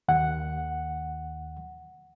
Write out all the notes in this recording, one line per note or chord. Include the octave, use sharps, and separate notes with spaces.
D#2 F#5